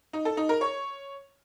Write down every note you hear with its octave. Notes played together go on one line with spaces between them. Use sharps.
D#4
A4
D#4
A#4
C#5